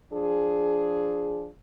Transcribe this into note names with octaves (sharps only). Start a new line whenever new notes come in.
F3 D4 G#4